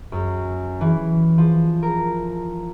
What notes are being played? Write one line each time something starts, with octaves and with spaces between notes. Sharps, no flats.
F#2
E3
F3
A#4